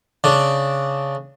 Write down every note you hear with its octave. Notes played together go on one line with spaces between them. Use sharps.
C#3 D4